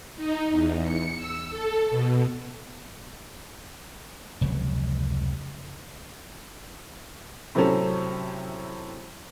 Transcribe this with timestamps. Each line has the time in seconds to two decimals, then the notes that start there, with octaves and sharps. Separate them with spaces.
0.17 D#4
0.51 E2
0.84 C#7
1.16 E6
1.50 A4
1.90 B2
4.41 F1 C#2 B2 F#3
7.55 A2 C3 F#3 C4 C#4 A4